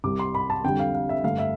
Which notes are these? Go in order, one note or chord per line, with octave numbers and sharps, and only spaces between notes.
C2 C3 G3 D6
C6
B5
A5
F2 D3 G3 G5
F5
F5
E5
G2 D3 A3 F5
E5